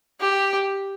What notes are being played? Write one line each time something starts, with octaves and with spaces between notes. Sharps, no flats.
G4